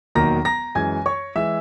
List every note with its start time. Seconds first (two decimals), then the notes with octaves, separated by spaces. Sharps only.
0.15 E1 D#2 D#3 F#3 A#3 A#5 A#6
0.45 A#5 A#6
0.75 F#2 E3 G#3 G#5 G#6
1.06 C#5 C#6
1.35 E3 G#3 E5 E6